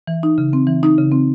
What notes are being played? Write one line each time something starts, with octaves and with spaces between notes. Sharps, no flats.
E3
D#4
C#3
C4
E3
D#4
C#3
C4